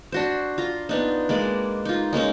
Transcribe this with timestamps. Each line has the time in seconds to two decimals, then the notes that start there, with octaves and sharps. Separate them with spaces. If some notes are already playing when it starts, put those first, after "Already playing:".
0.12 D4 F#4 C5
0.58 F4 A#5
0.89 B3 D4 D#4
1.29 G#3 A#3 B4 D5
1.85 D#4 F4
2.13 G#3 A#3 C#4 D#4